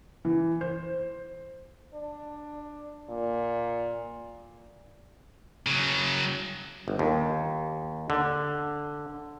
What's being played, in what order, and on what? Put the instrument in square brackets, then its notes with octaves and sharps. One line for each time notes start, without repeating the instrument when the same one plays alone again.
[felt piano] E3
C5
[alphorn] D4
A#2
[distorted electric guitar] C#3 F#3
[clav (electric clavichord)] G1
D#2
D3